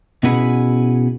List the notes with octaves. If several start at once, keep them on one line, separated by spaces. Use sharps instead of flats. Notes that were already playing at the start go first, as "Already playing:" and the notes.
B2 C#4 E4 F#4 G#4 B4